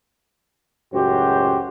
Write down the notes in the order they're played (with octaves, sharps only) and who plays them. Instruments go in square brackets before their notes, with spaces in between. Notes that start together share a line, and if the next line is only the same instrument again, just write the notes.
[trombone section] C#2 F#2 A2 F#4 G4 C5